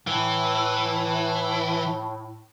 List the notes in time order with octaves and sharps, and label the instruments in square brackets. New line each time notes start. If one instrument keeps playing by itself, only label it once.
[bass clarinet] A2 [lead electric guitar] E3